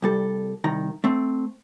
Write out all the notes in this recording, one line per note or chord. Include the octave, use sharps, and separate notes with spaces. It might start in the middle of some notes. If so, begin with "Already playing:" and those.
C2 G3 A4
C2 D#3 A#5
A3 C4